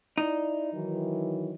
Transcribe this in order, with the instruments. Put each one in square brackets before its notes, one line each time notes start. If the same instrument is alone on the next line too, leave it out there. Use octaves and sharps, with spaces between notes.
[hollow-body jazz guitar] D#4 [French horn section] E4 D5
[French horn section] D#3 E3 F#3